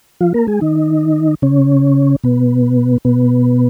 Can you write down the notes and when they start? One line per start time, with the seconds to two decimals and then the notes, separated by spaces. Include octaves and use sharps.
0.21 F3 F4
0.34 A#3 A#4
0.47 G#3 G#4
0.61 D#3 D#4
1.42 C#3 C#4
2.24 B2 B3
3.05 B2 B3